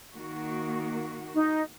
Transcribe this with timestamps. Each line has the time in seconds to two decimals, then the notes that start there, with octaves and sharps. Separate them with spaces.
0.15 D#3 A#3 F#4
1.34 D#4